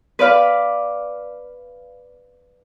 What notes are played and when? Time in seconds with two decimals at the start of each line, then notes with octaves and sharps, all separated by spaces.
0.19 B4 D5 F5 B5